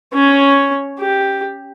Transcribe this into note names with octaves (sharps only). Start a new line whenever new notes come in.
C#4 C#5
G4